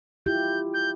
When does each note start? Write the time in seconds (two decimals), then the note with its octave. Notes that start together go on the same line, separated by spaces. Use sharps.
0.26 E4 F4 G4 G6
0.74 G6